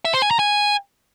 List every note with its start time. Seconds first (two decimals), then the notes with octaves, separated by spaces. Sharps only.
0.05 E5
0.14 C5
0.22 G#5
0.31 A#5
0.39 G#5